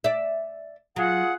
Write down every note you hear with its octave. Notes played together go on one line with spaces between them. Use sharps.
D5 E5
F#3 F4 G#4 F#5